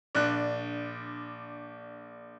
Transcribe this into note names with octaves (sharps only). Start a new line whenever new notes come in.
A#1 D4 F#6